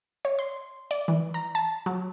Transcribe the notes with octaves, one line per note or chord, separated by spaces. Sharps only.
C#5
C6
D5
E3
A#5
A5
F#3